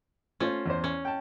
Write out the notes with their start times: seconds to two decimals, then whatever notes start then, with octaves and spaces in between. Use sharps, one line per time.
0.40 A3 C#4 F4 C5
0.66 E2 C5
0.84 C#4
1.05 G5 A5